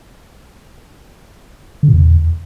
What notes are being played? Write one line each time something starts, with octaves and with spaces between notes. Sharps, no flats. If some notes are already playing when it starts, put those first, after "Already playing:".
D3
A#2
E2